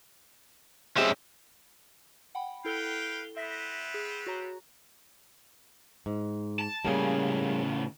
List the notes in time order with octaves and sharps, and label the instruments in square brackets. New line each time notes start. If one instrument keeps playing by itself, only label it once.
[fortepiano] G#3 C4 G4 [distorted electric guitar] C#4 E5
[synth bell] F#5 G5 B5
[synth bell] E4 A4 G7 [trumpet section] B4 F5 G5
[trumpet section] B3 C4 B4 [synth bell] E5 A#6 B6
[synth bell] G#4
F#4 C#5 A#5
[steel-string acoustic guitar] G#2
[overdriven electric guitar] A5
[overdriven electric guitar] A2 C#3 [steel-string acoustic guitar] G3 A#3 G#4